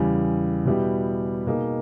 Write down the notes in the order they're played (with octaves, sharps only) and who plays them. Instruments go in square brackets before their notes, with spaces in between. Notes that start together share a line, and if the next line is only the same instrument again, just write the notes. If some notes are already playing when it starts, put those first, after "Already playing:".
Already playing: [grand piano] E2 C#3 G3
B2 G3 B3 E4 G4
B2 A#3 D#4 G#4